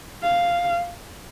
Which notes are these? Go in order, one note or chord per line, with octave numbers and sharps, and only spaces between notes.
F5